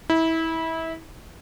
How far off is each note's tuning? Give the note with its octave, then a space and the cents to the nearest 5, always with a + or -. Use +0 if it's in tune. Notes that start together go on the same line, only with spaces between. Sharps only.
E4 -25